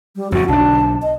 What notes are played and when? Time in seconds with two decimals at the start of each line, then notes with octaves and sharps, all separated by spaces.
0.16 G3
0.32 F2 A2 C#3 F#4
0.48 B1 D3 D4 A5
1.02 D#5